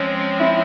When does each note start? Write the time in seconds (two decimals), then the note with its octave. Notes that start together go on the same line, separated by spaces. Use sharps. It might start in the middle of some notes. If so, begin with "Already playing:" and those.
Already playing: F3 G#3 C4 C#4
0.40 E4